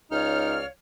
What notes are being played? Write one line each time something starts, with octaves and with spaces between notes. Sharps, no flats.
C#2 D#4 C#5 D5 F5 F6